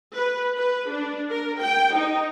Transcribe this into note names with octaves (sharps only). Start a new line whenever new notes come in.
B4
B4
D4
A#4
G5
D#4